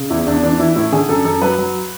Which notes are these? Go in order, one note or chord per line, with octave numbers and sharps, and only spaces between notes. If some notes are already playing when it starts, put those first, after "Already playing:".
Already playing: C#3
E2 E4
E2 D4
E3 D4
E3 E4
A2 E4
D3 G#4
F#2 A4
F#2 A4
F#3 B4
F#3